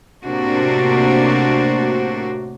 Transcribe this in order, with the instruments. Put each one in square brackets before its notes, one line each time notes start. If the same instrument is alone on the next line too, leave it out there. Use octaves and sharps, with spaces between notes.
[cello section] A2 C3 A#3 D4 F#4 C5